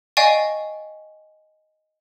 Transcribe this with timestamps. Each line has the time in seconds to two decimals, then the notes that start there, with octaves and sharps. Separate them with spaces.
0.17 D5 D#5 F5 G5 G#5 C#6